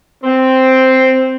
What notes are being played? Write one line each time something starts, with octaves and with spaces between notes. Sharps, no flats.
C4